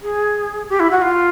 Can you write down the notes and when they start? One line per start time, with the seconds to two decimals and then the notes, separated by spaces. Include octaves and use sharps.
0.02 G#4
0.69 G4
0.80 E4
0.91 F#4
1.02 F4